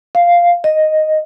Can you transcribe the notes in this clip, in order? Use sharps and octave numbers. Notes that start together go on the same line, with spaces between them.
F5
D#5